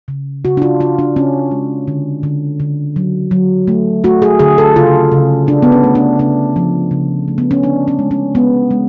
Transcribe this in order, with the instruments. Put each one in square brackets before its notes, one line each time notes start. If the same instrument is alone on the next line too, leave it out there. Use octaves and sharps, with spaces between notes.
[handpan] C#3
C#3 F#4
D4
F4
C#3 F4
D4
C#3 C#4
G#3
D3
D3
D3
F#3
F#3
A3
A3 F#4
G#4
D3 G#4
A4
C#3 F4
C#3
C#3 D4
B3
C#4
A3
D4
C#3 D4
F3
C#3
A3
B3
C#4
D3 D4
C#4
G#3
C#4
G#3 B3
G#3